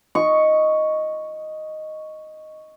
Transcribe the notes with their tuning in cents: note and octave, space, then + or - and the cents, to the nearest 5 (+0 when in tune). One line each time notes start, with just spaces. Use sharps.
D#5 +0 C#6 +0